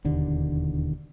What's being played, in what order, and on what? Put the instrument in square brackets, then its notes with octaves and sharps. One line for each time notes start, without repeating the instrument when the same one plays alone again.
[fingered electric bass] E1 D#2 D3